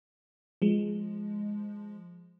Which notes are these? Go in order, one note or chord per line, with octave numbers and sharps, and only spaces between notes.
F3 G#3